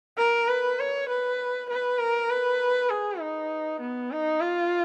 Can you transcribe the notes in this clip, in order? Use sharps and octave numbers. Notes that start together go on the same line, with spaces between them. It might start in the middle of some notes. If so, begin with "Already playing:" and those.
A#4
B4
C#5
B4
B4
A#4
B4
G#4
D#4
B3
D#4
F4